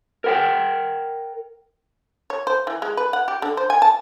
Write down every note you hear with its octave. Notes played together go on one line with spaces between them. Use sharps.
A#4 F#5 G5
C#5
C5
E3
G#3
B4
F#5
G4
D3
C5
G#5
A5